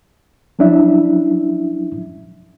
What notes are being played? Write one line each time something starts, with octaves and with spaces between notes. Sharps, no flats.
F3 F#3 C#4 D4 E4 E5